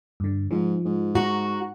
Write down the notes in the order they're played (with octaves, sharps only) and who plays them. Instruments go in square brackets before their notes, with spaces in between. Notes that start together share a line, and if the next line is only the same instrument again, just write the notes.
[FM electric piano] G2 D3
[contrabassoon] G#2 [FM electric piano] F3
[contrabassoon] G#2
[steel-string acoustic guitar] F#4 [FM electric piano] A#5 C#6